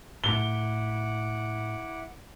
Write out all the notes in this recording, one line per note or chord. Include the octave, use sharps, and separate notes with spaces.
A2 E4 F#5 D6 G7